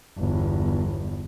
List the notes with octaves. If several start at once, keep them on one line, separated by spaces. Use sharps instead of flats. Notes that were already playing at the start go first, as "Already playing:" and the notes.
G1 E2